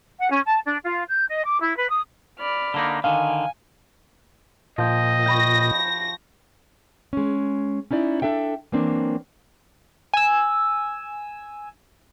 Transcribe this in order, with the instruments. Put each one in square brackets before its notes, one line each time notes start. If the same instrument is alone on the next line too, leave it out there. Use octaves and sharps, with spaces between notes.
[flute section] F#5
C#4
A5
D4
F4
G6
D#5
D6
E4
B4
D#6
[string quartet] D5 B5 F6
[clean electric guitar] D3 A#3 D#4
[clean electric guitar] D3 D#3 [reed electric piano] F5 [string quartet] G#5
[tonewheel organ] A#2 [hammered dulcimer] F3 G5 [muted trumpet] D#5
[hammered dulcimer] G5 B5 C#6 [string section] A#6
[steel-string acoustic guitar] G#3 C#4
C#4 D#4 E4 D5
D4 A4 E5 G5
E3 F#3 A#3 C4 D4
[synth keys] G#5 E6